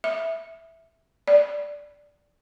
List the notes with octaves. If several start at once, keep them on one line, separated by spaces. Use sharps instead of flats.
E5
D5